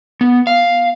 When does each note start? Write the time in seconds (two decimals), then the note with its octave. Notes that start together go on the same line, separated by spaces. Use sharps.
0.21 B3
0.47 F5